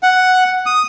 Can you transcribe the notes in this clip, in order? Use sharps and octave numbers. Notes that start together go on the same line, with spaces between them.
F#5
D#6